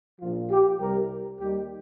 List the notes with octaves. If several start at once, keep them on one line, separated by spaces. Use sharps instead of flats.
A#1 A#2 F3 F4
G4
C2 C3 G3 A#4
D#2 D#3 G3 G4